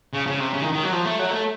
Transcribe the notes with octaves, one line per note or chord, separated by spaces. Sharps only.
C#3
C#3
C3
C#3
D#3
D#3
F#3
F3
A3
F#3
A3